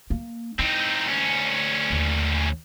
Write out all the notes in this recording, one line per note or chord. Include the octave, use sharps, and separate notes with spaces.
A#3
C4 D#4 E4
D2 C#4
D#2